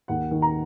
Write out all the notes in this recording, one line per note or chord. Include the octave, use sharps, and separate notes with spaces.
D#2 F#5
D#3
A#5